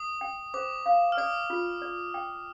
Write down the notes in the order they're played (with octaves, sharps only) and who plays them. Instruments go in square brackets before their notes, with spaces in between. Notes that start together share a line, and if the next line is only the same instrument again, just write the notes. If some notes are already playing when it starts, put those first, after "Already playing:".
Already playing: [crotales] D#6
[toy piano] G5
[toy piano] C5 [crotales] D6
[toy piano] F5
[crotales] F6
[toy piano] D5 [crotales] D#6
[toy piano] F4
D5
G5